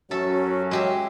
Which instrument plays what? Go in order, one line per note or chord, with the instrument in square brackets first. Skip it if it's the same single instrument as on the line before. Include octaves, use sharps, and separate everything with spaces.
[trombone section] F#2 F#3 C#4 [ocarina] F#4 [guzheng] A4 E5
[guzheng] G#3 G4 E5 [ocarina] F#4